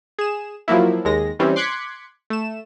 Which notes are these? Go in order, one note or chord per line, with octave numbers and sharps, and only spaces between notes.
G#4 E7
F3 F#3 A#3 E4
D#2 G#3 A#6
E3 G3 C4 C#4
C6 D6 F#6 G#6 B6 C#7
A3 E7